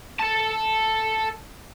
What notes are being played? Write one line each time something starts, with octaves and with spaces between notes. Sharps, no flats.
A4 A5